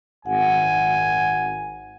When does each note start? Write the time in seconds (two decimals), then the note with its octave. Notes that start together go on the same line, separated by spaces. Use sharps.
0.26 G#1 F#5 G#5